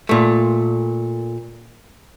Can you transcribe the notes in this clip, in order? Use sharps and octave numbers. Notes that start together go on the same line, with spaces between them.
A#2 A3